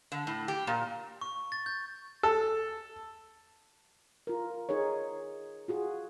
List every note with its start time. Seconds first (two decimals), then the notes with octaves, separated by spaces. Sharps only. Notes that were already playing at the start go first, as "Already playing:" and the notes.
0.12 D3
0.27 A2
0.48 G4
0.67 A#2
1.21 C#6
1.52 A6
1.66 G6
2.23 A4
4.27 F4 A#4
4.69 D#4 G#4 A#4 C#5
5.68 F4 F#4 G#4